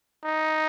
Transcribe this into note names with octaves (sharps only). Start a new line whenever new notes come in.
D#4